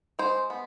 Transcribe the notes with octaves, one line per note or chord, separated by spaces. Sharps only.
G#3 C5
B3